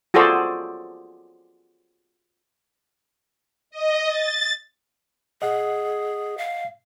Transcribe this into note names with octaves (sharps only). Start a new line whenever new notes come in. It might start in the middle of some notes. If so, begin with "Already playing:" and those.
F4 F#4 G#4 A4 C5 D5
D#5
A6
G#4 D#5 F#5
F5